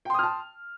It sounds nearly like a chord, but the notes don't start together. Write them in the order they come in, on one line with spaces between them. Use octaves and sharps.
G5 C6 D#6 F6 A5